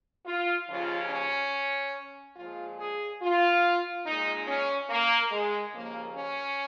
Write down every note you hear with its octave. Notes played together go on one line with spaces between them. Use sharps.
F4
D#2 C#3 F3 F4
C#4
A#2 F3 G#3 F4
G#4
F4
A#2 G#3 D#4
C#4
A#3
G#3
D#2 C#3 F3 A#3
C#4